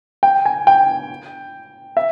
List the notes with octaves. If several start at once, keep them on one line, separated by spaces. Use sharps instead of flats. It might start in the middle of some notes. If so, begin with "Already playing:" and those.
G5
G#5
G5
E5